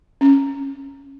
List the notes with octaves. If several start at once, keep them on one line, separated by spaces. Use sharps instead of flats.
C#4